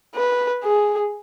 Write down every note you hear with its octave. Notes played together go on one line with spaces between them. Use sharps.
B4
G#4